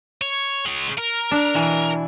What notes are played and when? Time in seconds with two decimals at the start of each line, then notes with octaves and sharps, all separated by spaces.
0.21 C#5
0.65 G#3 C#5
0.98 A#4
1.31 D4
1.54 B2 E3